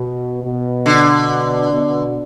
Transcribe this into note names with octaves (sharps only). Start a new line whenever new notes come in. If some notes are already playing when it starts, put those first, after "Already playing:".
Already playing: B2
B2
D3
B2